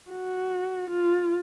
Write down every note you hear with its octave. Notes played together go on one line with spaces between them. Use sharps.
F#4
F4